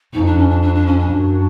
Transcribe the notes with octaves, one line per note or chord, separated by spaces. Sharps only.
F2 D#4
D4
C#4
D4
D4
D4
C#4
D4
F#2